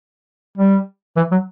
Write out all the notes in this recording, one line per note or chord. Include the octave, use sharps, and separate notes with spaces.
G3
E3
F#3